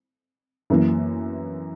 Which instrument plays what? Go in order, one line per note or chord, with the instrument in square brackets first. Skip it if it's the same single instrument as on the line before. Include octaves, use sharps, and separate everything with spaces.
[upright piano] F#2 E3 A#3